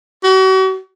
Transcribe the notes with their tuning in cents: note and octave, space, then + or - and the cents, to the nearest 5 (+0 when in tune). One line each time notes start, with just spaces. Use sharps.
F#4 +40